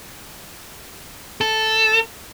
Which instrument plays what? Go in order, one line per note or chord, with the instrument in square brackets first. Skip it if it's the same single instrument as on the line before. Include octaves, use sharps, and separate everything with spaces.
[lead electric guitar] A4